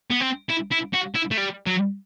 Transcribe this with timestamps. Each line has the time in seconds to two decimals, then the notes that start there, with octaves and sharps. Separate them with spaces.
0.11 B3
0.21 C4
0.50 E4
0.72 E4
0.94 F#4
1.15 E4
1.31 A3
1.38 G3
1.66 F#3